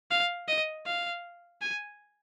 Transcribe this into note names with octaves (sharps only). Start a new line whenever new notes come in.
F5
D#5
F5
G#5